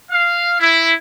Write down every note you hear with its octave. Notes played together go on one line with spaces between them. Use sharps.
F5
E4